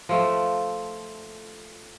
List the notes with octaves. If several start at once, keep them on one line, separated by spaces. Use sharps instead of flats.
F3 A3